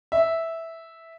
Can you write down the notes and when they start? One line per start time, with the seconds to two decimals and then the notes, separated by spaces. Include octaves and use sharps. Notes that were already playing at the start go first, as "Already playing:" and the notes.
0.12 E5